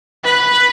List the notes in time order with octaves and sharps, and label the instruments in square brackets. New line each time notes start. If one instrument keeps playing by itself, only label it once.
[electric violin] B4